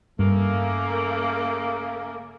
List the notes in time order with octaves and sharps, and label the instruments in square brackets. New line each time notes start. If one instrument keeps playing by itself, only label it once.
[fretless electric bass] G2 [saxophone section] C#3 A3 A#3